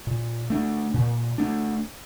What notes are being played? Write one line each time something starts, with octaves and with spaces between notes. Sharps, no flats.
A#2
A3 D4
A#2
A3 D4